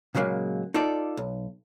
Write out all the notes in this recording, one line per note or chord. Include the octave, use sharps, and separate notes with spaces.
A#2 C#3 F#3 G#3 A#3
D#4 F4 A4 D5
B1